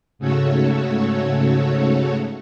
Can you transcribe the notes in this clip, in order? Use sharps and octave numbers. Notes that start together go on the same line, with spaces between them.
G#2 C#3 A3 F#4 A4 C#5